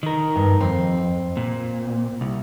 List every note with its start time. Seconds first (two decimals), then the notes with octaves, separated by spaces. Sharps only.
0.03 D#3 A#4
0.36 G2
0.60 F2 C4
1.37 A#2
2.21 C2